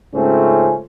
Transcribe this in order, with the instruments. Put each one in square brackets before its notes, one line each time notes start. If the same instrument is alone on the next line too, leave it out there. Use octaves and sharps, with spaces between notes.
[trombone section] G#2 C#3 A3 C4 C#4 F4